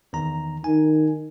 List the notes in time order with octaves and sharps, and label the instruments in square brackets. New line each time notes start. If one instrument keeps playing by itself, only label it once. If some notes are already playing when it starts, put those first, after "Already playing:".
[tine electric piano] E2 D#3 A#5
[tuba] D#3 [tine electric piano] G#5